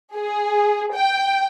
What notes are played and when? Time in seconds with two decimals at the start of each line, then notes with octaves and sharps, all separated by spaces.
0.15 G#4
0.94 G5